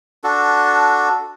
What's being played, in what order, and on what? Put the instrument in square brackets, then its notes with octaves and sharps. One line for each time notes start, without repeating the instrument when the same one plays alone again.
[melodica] D4 F#4 A4